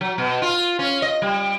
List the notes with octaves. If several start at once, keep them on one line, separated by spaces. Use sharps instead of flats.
F#3
B2
F4
C#4
D#5
G3